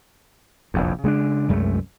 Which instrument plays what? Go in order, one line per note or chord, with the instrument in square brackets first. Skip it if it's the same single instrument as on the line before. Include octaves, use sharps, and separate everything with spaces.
[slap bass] F1 A#1 E2
C#3 G#3 B3 D4
C2 F#2 G#3 A3